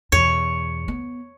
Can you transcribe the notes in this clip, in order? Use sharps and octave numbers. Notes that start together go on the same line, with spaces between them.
E2 B2 C#5
B3